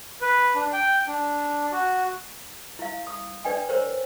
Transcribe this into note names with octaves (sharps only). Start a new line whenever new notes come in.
B4
D4
G5
D4
F#4
E4 F5
D#6
D4 B4 D5 G5 G#5
A#4 C5 C#5